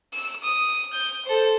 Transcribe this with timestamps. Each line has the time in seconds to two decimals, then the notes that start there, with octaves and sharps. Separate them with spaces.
0.13 E6
0.44 D#6
0.94 G6
1.26 A4 C5